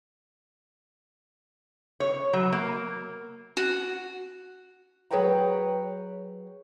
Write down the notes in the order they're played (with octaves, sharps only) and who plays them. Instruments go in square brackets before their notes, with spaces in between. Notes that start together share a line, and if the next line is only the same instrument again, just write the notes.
[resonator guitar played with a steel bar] C#5
F#3
A#3
[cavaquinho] F#4
[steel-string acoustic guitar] F#3 G#4 B4 C#5 G5 A#5